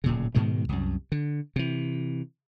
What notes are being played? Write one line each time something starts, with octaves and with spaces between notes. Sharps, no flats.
D1 A#2 C#3
G#2 B2 D#3 G#3
C2 F#2
D3
C3 E3